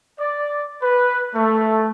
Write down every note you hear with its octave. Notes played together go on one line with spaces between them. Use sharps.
D5
B4
A3